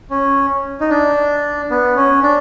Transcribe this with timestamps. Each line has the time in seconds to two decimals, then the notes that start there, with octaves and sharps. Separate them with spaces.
0.11 C#4
0.81 D#4
0.90 D4
1.70 B3
1.96 C#4
2.23 D4